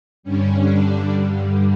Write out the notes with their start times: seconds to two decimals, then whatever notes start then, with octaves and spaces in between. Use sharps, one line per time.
0.23 G2 D3 G3 C#4
0.63 D4